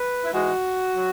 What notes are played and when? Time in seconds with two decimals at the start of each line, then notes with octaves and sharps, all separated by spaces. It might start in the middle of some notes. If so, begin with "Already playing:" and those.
Already playing: B4
0.25 E4
0.32 G#2 E3 G#3 F#4
0.95 F#3